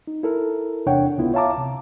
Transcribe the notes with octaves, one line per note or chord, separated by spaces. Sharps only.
D#4
E4 A4 A#4
E2 C3 D4 C#5 F#5 G5
C#2 B3 E4 F4
C#5 E5 F5 A5 A#5 D6
C3